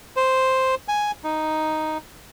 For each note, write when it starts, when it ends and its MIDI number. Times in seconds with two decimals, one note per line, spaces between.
0.16 0.75 72
0.88 1.11 80
1.24 1.98 63